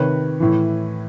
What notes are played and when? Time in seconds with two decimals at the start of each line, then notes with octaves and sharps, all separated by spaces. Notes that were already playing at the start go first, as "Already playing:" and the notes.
Already playing: C3 D#3 B4 C#5
0.40 A2 E3